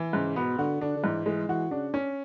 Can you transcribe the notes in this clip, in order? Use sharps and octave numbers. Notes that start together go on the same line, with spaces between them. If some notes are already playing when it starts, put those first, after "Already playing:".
Already playing: E3
G#2 C#3
B2 B3
D3 F#4
D3 D4
D3
G#2 E3
E3 G#3
E3 F#4
C#3 D4
C#4